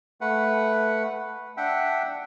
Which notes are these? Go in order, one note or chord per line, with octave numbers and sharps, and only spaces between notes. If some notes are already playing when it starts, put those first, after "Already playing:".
A3 B4 F#5
D4 E5 F#5 G5